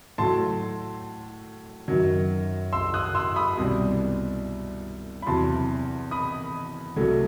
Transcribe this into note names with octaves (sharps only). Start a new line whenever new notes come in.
A2 F#3 A3 A5 C6
F#2 D#3 F#3
C6 E6
D#6 F#6
C6 E6
B5 D#6
C2 B2 G3
B5
E2 C3 F#3 A5 C6
B5 D#6
C2 C3 F#3 A3